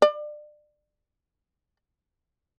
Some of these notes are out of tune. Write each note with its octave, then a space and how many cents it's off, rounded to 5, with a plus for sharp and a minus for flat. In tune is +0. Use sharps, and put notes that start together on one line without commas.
D5 +30